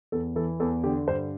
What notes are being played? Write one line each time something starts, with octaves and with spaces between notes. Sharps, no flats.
E2 A4
E3 A4
E2 A4
D3 G4
G2 C5